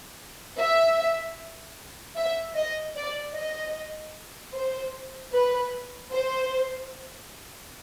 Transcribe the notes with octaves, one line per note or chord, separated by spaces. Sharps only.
E5
E5
D#5
D5
D#5
C5
B4
C5